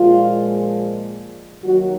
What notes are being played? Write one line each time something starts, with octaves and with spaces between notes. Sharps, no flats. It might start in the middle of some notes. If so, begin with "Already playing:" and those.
Already playing: A#2 F3 G#3 F4
D#2 D#3 F#3 F#4